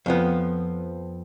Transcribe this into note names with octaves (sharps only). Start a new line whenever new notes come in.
F2 F3 B3